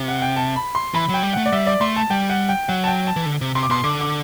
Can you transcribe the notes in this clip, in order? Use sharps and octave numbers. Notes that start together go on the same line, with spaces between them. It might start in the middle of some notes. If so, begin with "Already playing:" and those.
Already playing: C3
F#5
G5
A5
B5
C6
E3 B5
F#3 G5
G3
A3 F#5
D5
G3 E5
D5
A3 C6
A5
G3 G5
F#5
G5
F#3 F#5
A5
G5
A5
E3
D3
C3
C3 C6
D6
B2 C6
D3 D6
D6